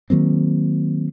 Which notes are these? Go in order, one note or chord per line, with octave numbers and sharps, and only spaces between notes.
D#3 F#3 A#3 C4